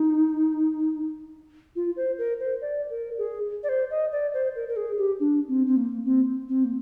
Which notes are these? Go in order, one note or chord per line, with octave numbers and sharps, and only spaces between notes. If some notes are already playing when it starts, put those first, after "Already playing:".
Already playing: D#4
F4
C5
A#4
C5
D5
A#4
G#4
D5
C5
D#5
D5
C5
A#4
A#4
G#4
G4
D4
C4
C4
A#3
C4
C4
A#3